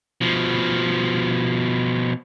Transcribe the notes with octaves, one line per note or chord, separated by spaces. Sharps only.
B2 F3